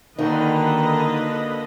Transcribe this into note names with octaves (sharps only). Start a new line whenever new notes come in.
D3 D#3 A#3 D4 D#4 F#4 B4 D#5